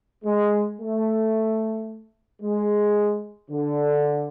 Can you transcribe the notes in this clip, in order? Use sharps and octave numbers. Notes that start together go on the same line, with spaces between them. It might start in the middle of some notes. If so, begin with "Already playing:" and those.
G#3
A3
G#3
D3